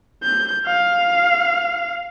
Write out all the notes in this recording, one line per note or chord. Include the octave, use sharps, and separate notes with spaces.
G6
F5